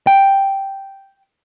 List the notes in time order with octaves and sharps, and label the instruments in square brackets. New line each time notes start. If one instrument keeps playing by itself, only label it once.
[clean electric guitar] G5